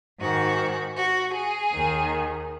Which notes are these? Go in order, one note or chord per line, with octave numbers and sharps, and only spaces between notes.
G#2 D#3 F#4
F#4
G#4
D#2 D#3